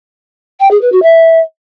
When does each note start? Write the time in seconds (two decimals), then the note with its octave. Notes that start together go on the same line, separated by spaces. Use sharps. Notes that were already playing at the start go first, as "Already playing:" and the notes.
0.60 G5
0.71 G#4
0.81 B4
0.92 F#4
1.03 E5